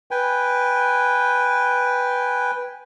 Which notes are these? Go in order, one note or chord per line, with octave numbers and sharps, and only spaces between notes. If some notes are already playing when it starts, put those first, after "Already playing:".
B4 G5 G#5